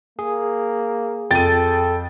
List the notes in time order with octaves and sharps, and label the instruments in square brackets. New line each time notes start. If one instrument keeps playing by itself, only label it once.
[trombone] A#3 [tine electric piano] G#4
[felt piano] F2 D#7 [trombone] A4 [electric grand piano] G5 A6